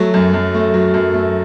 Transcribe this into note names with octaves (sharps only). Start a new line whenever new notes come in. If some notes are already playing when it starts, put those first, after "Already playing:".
Already playing: F#3 A3
F#2
F#2
A3
F#3
F#2
A3